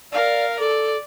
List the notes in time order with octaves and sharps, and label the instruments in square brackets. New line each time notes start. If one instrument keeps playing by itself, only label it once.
[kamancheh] A#4 F5 [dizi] D5
[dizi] A4 [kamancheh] D5